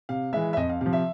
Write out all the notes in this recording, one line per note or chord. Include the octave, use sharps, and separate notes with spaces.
C3 F5
E3 G#3 E5
E5
F2 D#5
F5
C3 F3 F5
E5